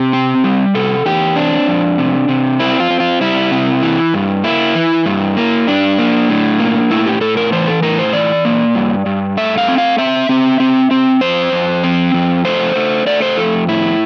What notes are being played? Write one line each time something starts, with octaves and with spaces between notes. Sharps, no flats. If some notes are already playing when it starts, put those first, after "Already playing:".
Already playing: C3 G4
C4
G3
C3 A4
E2 G4
C4 D4
F2
C3
C3
C4 E4
F4
C4
F4
G3 E4
C3
E3
G2
A#3 E4
E3
G2
A#3
G2 D4
A#3
A2
A#3
A2 E4
G4
A2 A4
A#4
E3 C5
A4
A2 A#4
C5
E3 D5
A#3
G2
G2
A3 E5
F5
C4
F5
C4 E5
C4
C4
C4
F2 C5
F2
C4
F2
A3 C5
A3
A3 D5
C5
F2 A4
A2 E4